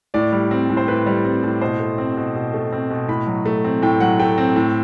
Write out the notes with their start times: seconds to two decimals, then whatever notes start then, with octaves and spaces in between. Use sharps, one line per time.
0.14 A2 D5
0.32 G3
0.51 C4
0.70 A2
0.77 C5
0.88 A2 B4
1.06 G3
1.25 C4
1.43 A2
1.61 B2 C5
1.80 A3
1.98 C4
2.17 B2
2.35 B2
2.54 A3
2.72 C4
2.90 B2
3.08 A2 B5
3.27 F#3
3.46 A3
3.64 C4
3.82 A2 G5
4.00 F#3 F#5
4.20 A3 G5
4.38 C4
4.56 A2